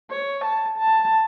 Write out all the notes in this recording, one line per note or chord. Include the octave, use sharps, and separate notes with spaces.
C#5
A5
A5